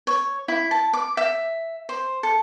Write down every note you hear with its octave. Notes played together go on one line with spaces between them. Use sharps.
C#5
E4
A5
D6
E5
C5
A4